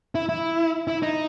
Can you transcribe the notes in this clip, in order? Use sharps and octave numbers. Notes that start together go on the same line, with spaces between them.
E4
E4
E4
D#4